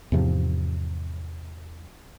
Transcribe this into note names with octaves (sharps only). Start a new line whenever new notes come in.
E2 G#2 C3 F3